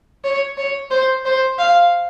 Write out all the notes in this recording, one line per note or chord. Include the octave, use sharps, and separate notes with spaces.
C#5
C#5
C5
C5
F5